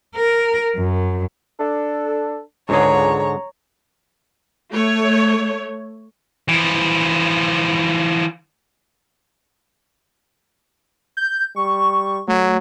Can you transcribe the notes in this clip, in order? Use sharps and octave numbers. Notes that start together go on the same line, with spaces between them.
A#4
F#2
D4 A4
C#2 G#2 D3 G#4 C#5 A#5
A3 C#5
E3 F3
G6
G3 C#6
F#3 A3